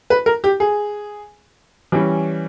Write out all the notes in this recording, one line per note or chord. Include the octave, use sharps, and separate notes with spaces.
B4
A#4
G4
G#4
E3 G3 C#4